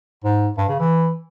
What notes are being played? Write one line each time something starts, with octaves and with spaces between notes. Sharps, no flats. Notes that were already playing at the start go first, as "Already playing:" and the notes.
G#2
G2
C#3
E3